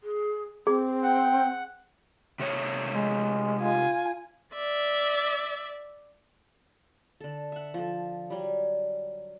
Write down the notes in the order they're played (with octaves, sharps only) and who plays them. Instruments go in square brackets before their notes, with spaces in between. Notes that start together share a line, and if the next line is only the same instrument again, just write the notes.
[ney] G#4
[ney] C4 [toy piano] G#4
[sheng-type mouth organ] F#5 [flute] G5
[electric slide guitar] C3 A3 C#5
[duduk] G#3
[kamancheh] F4 G#5
[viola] D5 E5
[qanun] D3 A4
E5 F#5
F3 A4
F#3 G3